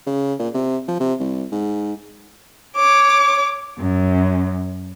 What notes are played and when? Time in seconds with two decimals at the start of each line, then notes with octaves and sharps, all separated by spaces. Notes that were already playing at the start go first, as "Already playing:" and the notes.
0.07 C#3
0.39 A#2
0.54 C3
0.88 F3
1.00 C3
1.20 C2
1.52 G#2
2.75 C#5 D6
3.77 F#2